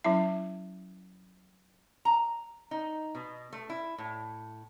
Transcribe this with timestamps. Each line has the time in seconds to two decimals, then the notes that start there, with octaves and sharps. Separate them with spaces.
0.04 F#3 C#4 E4 E5
2.05 A#5
2.71 D#4
3.15 B2
3.53 A3
3.70 E4
3.98 A2